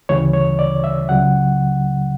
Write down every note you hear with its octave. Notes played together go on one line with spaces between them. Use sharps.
D2 C#3 E3 G3 C#5
C#5
D5
E5
C#2 C#3 F#3 F#5